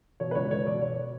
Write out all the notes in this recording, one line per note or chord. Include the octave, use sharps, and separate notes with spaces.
B2 C#5
B4
C#2 C#5
C#2 C#5
B2 D5
B2 C#5